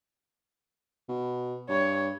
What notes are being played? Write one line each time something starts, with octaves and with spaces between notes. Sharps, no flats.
B2
G2 C#5